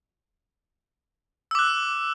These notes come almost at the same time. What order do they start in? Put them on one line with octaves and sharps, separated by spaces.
E6 D6 F#6